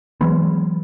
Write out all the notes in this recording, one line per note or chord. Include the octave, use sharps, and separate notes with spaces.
E3 F#3 G#3 B3